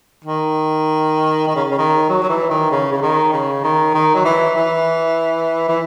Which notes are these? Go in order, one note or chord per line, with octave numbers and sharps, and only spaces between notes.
D#3
D#3
C#3
C#3
D#3
F#3
F#3
E3
D#3
C#3
C#3
D#3
C#3
D#3
D#3
F#3
E3
E3
E3